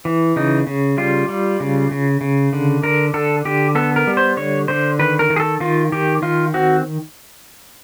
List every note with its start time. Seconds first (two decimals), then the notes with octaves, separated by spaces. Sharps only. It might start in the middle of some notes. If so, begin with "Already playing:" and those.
0.05 E3
0.36 C#3 D#4
0.67 C#3
0.98 G3 F4
1.29 G3
1.60 C#3
1.91 C#3
2.21 C#3
2.53 D3
2.83 D3 A#4
3.14 D3 A4
3.45 D3 G4
3.75 B3 A4
3.96 A#4
4.07 G3
4.17 C5
4.37 D3 C#5
4.68 D3 C5
4.99 D#3 B4
5.19 A#4
5.30 D#3
5.36 G#4
5.40 A4
5.60 D#3 F4
5.92 D#3 G4
6.22 D#3 F4
6.54 C4 F#4